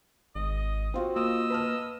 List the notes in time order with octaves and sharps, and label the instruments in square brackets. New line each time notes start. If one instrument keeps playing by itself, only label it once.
[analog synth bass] G#1 [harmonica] D#5
[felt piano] C4 F4 F#4
[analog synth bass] A#3 [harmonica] D#5 E6
[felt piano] B4 A5 F6